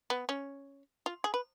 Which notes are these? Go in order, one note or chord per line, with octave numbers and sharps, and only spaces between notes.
B3
C#4
F4
G#4
B4